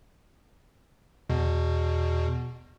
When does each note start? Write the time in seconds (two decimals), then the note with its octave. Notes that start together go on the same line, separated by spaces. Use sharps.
1.30 E2 B2